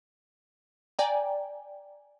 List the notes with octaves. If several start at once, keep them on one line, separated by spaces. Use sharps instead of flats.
D5 G5 G#5 A#5